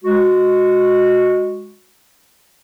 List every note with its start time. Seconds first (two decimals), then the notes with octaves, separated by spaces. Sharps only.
0.04 G#3 F#4